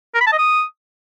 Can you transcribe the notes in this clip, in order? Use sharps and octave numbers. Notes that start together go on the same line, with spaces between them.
A#4
B5
A5
D#5
D#6